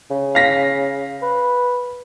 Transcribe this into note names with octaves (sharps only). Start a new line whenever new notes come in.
C#3
F5 A#6 B6
B4